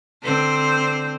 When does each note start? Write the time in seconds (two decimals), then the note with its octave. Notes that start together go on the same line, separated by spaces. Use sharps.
0.22 D3 C4 C5